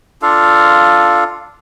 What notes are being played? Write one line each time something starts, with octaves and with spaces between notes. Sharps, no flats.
D4 F4 A4 F5